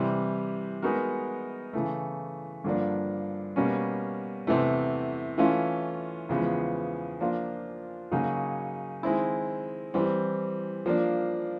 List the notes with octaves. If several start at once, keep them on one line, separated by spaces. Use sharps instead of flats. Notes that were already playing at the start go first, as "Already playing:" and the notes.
Already playing: C3 E3 G3
G#3 B3 D#4 F#4 A#4
C#3 E3 A3
G2 D3 F3 A#3 D4
B2 G3 A#3 C#4
E2 C3 E3 A3
E3 A3 C#4 F4
E2 C#3 F3 G#3 B3
F3 A#3 D4 F4
C#3 F#3 A#3 D#4 F#4
D#3 G#3 C4 E4
E3 G3 C4
F3 A#3 D4